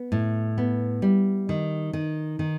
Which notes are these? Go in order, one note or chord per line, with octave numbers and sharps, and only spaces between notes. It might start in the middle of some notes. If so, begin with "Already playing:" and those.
Already playing: B3
A2
B3
G3
D#3
D#3
D#3